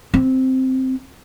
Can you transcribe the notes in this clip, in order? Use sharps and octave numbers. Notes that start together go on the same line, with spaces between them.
C4